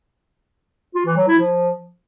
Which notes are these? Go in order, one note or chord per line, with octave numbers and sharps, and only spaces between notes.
F4
E3
F#3
E4
F3